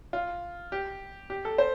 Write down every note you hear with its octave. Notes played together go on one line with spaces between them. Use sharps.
F4
G4
G4
A4
C5